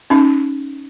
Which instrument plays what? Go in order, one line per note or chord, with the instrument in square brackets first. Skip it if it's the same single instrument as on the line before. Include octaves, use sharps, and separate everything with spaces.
[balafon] C#4 D#4